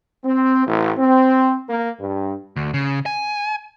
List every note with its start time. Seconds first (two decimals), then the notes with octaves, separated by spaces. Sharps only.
0.24 C4
0.66 A1
0.98 C4
1.68 A#3
1.99 G2
2.56 D2
2.74 C#3
3.06 G#5